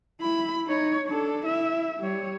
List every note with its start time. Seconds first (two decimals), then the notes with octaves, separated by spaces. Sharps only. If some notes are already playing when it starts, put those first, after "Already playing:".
0.21 E4 B5
0.66 D#4 C#5
1.08 D4 A4
1.45 E4 E5
1.99 G3 C#5